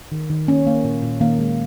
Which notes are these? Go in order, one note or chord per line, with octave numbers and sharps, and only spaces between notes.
D#3
D#3
A#3 C#4
A#3
A#2
A#2
D#3 A#3
G#3